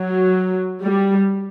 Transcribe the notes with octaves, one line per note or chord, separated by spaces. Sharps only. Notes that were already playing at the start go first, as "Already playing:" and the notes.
Already playing: F#3
G3